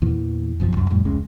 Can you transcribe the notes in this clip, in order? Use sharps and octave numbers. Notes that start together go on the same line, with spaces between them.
E2 A#2 E3
F#1 B1 A2 F3
C2 F#2
F2 A2 G3
F1 C#2 G#3 C#4